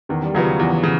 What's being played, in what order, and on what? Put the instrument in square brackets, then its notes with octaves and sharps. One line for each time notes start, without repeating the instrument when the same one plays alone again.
[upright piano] E2 [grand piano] D#3
[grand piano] G3
[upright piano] C#3 F#3 B3 [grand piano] F3
[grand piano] F3
[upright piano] E2 [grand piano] E3
[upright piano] C#3